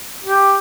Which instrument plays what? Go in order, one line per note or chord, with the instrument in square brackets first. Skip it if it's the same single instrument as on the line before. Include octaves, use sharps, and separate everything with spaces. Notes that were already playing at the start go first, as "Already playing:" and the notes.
[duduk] G4